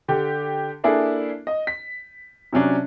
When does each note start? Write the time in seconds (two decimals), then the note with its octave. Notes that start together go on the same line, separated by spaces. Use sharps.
0.08 D3 G4
0.84 A#3 D4 E4 G#4 A4
1.47 D#5
1.67 B6
2.53 C3 F#3 C#4 D4